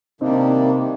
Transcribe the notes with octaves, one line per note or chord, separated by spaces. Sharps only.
C3 D#3 G3 A#3 C4 D4 D#4